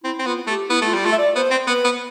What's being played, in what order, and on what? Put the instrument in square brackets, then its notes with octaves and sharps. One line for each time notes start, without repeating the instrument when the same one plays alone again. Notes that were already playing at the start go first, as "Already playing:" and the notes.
[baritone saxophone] C4 [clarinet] E4
[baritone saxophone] C4
[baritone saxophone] B3 [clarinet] F4
[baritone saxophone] A3 [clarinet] G4
[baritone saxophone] B3 [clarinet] E4
[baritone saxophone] A3 [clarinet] F4
[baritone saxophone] G3
[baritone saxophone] A3 [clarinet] F4
[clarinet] E5
D5
[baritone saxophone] B3 [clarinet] C5
[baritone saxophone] C4
[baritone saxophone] B3 [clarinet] B4
[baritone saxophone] B3